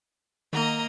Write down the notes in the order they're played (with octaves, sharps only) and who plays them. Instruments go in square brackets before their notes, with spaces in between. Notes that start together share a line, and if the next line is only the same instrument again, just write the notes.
[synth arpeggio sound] D#3 F#5 [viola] A#3 [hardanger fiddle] D#5 A#5